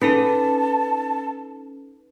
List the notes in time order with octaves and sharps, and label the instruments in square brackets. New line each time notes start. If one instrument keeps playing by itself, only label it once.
[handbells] C#4 D#4 A4 [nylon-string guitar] B4 [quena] A5